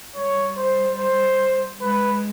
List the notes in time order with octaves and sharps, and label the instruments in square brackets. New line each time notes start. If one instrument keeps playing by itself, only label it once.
[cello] G3 [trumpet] C#5
[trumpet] C5
C5
[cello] G#3 [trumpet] B4